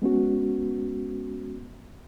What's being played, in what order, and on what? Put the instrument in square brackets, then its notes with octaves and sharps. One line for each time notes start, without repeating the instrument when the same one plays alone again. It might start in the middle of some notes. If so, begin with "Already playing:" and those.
[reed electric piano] G#3 B3 C#4 F#4